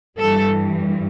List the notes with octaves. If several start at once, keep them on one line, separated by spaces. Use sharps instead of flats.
G2 E3 G3 A4